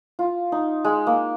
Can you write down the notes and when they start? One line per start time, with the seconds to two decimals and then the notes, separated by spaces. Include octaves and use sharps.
0.19 F4
0.52 D#4
0.85 G#3
1.07 A#3